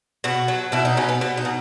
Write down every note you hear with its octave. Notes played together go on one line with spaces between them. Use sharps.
B2 F#4
F#3
B2 E4
D#4
B2 C#4
B3
B2 B3
D#4
B2